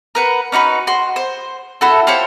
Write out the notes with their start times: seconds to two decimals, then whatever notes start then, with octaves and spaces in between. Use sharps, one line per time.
0.15 A#4 B4 F#5
0.52 C#4 D#4 F#4 B4
0.87 F#4 C6
1.16 C5
1.81 E4 F#4 A4
2.07 F4 G4 C5 C#5